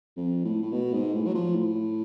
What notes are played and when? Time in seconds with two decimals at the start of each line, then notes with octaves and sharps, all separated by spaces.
0.17 F2
0.45 A2
0.62 A2
0.72 B2
0.93 G#2
1.14 A2
1.27 F#3
1.35 F3
1.56 A2